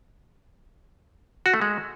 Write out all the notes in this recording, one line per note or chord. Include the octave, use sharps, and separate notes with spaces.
F#4
A3
G#3